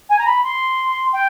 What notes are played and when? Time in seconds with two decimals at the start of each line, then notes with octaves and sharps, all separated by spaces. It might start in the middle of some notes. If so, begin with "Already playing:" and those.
0.09 G#5
0.19 A#5
0.26 B5
0.44 C6
1.13 G5